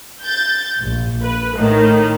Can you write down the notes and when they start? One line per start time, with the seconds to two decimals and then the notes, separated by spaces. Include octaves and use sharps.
0.23 G6 A6
0.78 A#1
1.21 B4
1.55 A2 D#3